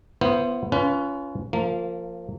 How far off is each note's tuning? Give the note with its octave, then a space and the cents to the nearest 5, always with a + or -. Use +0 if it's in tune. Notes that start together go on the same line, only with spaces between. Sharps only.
B3 +0 E4 +40 C5 +0
C#4 +20 F4 -20 B4 +0
F3 +0 A#3 -25